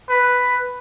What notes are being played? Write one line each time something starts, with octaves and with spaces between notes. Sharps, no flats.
B4